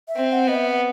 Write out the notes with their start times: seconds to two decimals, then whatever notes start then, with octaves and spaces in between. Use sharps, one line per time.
0.08 E5
0.16 C4
0.32 F#5
0.47 B3 D#5
0.55 E5